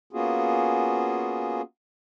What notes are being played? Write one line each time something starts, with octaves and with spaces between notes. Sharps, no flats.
A#3 B3 C#4 F4 F#4 G#4